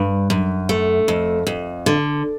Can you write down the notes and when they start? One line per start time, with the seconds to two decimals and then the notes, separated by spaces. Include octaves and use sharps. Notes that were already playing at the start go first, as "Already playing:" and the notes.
Already playing: G2
0.30 F#2
0.69 A3
1.08 F2
1.47 F2
1.86 D3